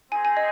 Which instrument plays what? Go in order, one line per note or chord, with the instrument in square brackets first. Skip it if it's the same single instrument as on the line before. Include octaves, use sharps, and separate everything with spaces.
[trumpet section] C4 D#4 G#4 C5 [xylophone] G#5
[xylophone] G#5
D#5